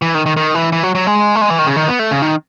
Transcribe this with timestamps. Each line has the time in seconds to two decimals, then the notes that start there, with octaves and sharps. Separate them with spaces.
0.02 E3
0.15 D#3
0.26 D#3
0.37 D#3
0.55 E3
0.72 E3
0.83 F#3
0.95 F#3
1.07 G#3
1.36 A3
1.41 G#3
1.50 E3
1.59 D#3
1.67 C#3
1.76 D#3
1.88 B3
1.99 A3
2.11 C#3
2.22 D#3